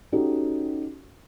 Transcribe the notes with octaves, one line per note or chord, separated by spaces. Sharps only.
C#4 D#4 F#4 G4 A4